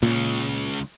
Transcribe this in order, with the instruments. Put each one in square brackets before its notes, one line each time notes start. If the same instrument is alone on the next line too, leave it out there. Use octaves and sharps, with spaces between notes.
[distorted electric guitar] C#2 C#3 [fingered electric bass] A#2